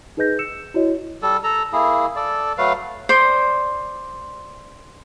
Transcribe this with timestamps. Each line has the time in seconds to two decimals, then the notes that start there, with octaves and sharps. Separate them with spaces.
0.17 D#4 G#4 B4 D#5 G6 A#6
0.39 E6 C#7 E7
0.74 E4 F#4 C#5 D#5
1.22 G3 A4
1.44 A4 A#5
1.73 A#3 E4 G#4
2.16 A4 D5
2.58 F#3 A3 B4 F5
3.09 C5 D5 C6